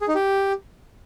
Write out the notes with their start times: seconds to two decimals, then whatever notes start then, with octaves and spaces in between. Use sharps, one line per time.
0.01 G#4
0.08 D#4
0.15 G4